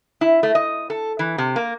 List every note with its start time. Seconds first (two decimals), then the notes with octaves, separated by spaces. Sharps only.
0.21 E4
0.43 A3
0.55 D#5
0.90 A4
1.19 E3
1.38 C3
1.56 A#3